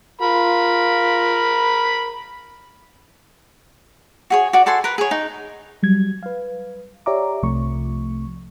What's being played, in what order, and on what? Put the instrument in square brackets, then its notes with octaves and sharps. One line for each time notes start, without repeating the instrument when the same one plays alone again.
[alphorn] F4 [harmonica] A#4 B5
[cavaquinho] F#4 G#4 C#5
F#4 D5
F#4 A4 G#5 C6
A#4 B4 A#5
G#4 C#5
D#4
[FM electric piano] F#3 G3 G#6
B4 F5
G4 C#5 D5 E5 A#5 D6
C2 C3 F3 A3 C#6